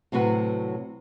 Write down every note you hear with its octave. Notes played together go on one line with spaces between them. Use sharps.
A2 C3 F#3 F#4 B4